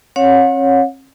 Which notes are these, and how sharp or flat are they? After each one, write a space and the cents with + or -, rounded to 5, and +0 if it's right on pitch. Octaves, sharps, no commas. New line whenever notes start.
C#4 -45 C#5 +0 F#5 -40